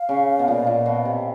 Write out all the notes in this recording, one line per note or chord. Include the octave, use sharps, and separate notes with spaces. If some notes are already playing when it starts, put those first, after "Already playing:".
Already playing: F5
C#3
B2
A#2
A#2
B2
C3